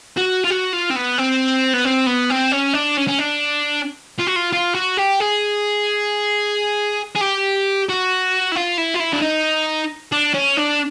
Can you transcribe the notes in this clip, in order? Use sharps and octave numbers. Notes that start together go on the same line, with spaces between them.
F#4
F4
F#4
F4
C4
B3
C4
B3
C4
B3
C4
C#4
D4
C#4
C#4
D4
F4
F#4
F4
F4
F#4
G4
G#4
G#4
G4
F#4
E4
F4
E4
F4
E4
D4
D#4
D4
C#4
D4